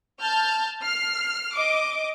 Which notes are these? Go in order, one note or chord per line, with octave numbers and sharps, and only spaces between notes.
A5 F6 G6
F6 C7
D#5 D6